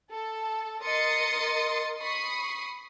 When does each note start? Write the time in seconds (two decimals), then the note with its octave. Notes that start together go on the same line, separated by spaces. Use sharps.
0.11 A4
0.83 A#4 D#5 C6 D#6 A6 C#7
1.99 B5 C#6 D#6 C7